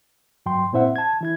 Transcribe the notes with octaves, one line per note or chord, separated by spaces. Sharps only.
G2 F#3 G5 C6
A#2 C4 E4 C5 E5 F#5
A5 G#6
E3 E4 G#6